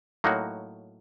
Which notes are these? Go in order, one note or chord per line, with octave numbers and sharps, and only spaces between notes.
A2 F#3 A#3 D#4 F#4